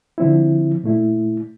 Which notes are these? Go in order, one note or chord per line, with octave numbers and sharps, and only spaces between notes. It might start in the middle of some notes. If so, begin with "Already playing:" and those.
D3 F3 C4 E4
A#2 A3 E4